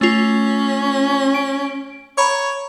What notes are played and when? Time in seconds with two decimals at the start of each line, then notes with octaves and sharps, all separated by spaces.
0.01 A3 C#4 F4
1.34 D7
2.18 C#5 A#5 B5 C#6